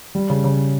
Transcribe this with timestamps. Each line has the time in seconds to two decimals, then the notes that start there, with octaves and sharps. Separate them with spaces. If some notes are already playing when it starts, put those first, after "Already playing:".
0.15 G3
0.30 C#3
0.44 C#3